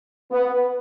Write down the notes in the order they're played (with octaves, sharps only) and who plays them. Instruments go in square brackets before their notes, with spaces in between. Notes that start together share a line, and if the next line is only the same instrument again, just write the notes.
[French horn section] B3